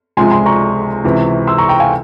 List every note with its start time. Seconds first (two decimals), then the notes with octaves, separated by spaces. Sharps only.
0.17 C#2 C3 F3 G#3 G#5 C6
0.32 G#5 C6
0.46 A#5 C#6
1.04 C#2 C3 E3
1.47 C6 E6
1.58 A#5 C#6
1.69 G5 A#5
1.80 F5 G#5